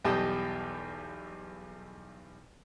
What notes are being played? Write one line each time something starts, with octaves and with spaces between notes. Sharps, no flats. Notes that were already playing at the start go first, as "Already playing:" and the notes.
B1 E2 G3 G4 D#5 A5